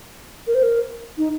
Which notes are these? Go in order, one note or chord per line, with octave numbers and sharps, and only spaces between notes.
A#4
C5
A#4
D#4